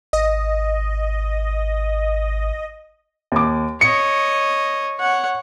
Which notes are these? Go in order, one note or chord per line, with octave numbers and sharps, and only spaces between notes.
G#1 D#5
D#2 D6
C#5 D#5 C#7
C#5 F#5